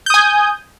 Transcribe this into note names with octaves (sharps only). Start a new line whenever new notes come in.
G#5 D#6 G6